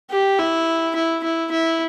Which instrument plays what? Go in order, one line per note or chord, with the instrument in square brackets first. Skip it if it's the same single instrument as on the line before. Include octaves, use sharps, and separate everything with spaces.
[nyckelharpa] G4
E4
E4
E4
E4